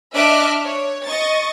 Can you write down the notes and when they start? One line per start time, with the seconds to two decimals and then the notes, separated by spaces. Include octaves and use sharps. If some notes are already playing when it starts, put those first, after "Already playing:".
0.13 D4 D#5 E5 D6 F6 F#6
0.64 C#5
1.05 D#5 C#6 A6